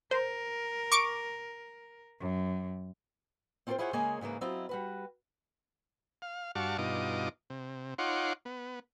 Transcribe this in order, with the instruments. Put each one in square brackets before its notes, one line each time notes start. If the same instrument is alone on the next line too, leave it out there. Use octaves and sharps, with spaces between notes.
[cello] A#4 [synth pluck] C5
[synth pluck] C#6 D6 D7
[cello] F#2
[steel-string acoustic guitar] C4 F4 F#4 A4 A#4 C5
E4 F4 G#4 C5 C#5 F#5
C#3 G#3 A#3 G#4 C#5 G#5
G#2 C#3 E3 A#3
F#3 C4 E4 F4 D#5
G3 F#4 B4
[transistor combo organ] F5
G2 F#4 D5 F5 A5 C#6
G2 B2 D#4 F4 D#5 D6
C3
D#4 F4 C#5 F#5 C6 D6
B3